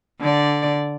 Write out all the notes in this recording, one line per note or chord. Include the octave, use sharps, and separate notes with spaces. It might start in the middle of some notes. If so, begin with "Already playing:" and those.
D3 D5